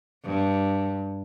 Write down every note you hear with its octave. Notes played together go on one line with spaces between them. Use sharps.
G2